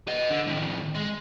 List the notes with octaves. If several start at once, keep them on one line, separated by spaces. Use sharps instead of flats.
B4 D#5
D3
A2 D#3
G#3